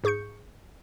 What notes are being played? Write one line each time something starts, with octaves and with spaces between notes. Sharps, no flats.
G#2 G#4 C#6 G6 C#7